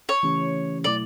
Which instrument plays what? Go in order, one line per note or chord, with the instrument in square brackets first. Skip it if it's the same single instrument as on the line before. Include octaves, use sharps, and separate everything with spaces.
[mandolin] C#5
[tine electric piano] C#3 E3 A3 C#4 G4
[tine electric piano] B2 F#3 A3 E4 [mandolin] D5